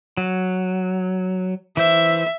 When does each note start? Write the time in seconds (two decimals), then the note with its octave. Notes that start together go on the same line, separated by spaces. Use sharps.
0.17 F#3
1.77 E3 C5 E5